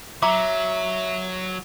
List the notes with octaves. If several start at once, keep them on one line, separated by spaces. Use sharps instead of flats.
F#3 E5 A#5 D6